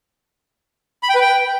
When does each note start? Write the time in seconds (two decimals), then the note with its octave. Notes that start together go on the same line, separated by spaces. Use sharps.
1.03 B5
1.09 G5
1.15 B4
1.21 G5